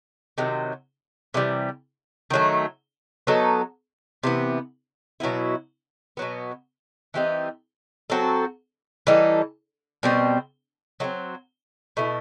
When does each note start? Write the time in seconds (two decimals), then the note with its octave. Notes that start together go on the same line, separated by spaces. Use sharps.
0.38 C3 D#3 F#3
1.34 C3 E3 G3
2.30 D#3 F#3 A3
3.27 F#3 B3 D#4 A4
4.23 C3 E3 B3
5.20 B2 F#3 B3 E4
6.17 B2 F#3 B3
7.14 E3 G3 C4 D#4
8.10 F#3 C4 F#4 A4
9.07 E3 G3 D#4 A4
10.03 B2 G3 C4
11.00 F#3 A3
11.04 C4
11.97 B2 A3 E4